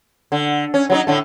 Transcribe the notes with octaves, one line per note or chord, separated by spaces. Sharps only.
D3
C#4
F#3 G3 D#4
A2 D3 A3